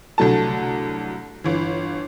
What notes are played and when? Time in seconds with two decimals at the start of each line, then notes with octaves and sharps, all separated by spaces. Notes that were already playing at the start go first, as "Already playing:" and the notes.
0.18 C2 D3 F#3 A3 A5
1.44 G1 E3